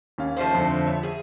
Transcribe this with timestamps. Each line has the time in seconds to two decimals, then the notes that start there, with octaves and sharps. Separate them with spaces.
0.18 D#2 C#4 F5
0.37 F3 A3 C5
0.55 F2 D3
0.87 C#5 E5
1.03 G#4